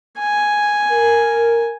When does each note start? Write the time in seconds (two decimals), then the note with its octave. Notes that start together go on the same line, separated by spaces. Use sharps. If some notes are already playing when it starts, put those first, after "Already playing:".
0.19 G#5
0.91 A#4